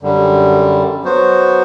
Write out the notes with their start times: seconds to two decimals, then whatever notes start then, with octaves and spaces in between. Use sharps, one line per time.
0.01 F#2 D3 G3
1.03 F#3 B3 F#4 C5